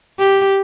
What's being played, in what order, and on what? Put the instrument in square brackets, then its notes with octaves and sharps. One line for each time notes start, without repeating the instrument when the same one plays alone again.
[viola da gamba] G4